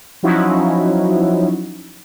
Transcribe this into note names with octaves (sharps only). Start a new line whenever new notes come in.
F3 F#3 C#4 D#4 E4 F#4